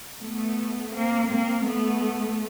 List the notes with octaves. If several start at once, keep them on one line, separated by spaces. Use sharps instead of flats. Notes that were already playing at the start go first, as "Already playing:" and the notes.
A3 B3
A#3 C4
A#3 C4
A3 B3